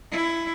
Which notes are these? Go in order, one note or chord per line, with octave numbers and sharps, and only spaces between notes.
E4